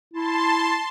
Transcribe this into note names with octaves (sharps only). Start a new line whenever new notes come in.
E4 A5 C6